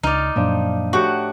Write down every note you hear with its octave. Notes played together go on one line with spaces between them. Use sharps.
C#2 D#4 D5 F6
F#2 A#2 F3 D4
A2 F#4 G4 F#5